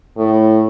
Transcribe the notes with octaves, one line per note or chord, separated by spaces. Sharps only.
A2